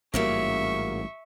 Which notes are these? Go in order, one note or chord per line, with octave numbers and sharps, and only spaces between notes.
A1 G#2 C#3 F#3 G3 A#3 E5 C#6